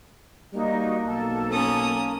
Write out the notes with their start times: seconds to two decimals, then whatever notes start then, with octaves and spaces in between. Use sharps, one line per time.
0.54 G3 A#3 D#4 F#4 D#5
1.06 B1 A4 A5
1.51 A#3 C#4 D#6